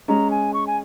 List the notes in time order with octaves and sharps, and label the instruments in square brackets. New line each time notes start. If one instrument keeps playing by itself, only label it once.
[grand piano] G#3 C#4 [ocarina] A#5
[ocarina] G#5
C#6
G#5